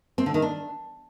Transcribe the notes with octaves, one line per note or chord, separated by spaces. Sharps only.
C4
D3
D#3
D4